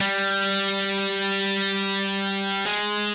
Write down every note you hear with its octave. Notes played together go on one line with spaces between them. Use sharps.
G3
G#3